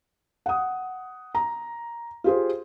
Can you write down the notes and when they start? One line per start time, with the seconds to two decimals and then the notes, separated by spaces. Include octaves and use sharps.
0.46 F#5 D#6
1.35 A#5
2.24 F4 G4 G#4 C5